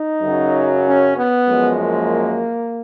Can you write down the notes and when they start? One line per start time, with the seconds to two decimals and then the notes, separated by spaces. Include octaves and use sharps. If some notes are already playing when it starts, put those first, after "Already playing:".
Already playing: D#4
0.22 F#2 C#3 F#3
0.85 C#4
1.16 B3
1.47 F#2 F3 G#3
1.79 A#3